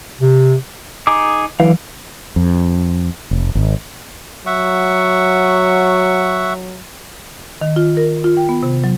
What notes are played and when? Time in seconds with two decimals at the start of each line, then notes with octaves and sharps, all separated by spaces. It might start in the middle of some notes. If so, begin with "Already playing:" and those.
0.22 C3
1.07 D#4 G#4 D6
1.60 D3 E3 F#3 F5
2.36 F2
3.31 F1
3.55 G#1
4.46 F#3 E5 F#5 C#6
7.62 D#3
7.76 F4
7.97 A#4
8.24 F4
8.37 G5
8.49 B3
8.63 C3
8.84 F#3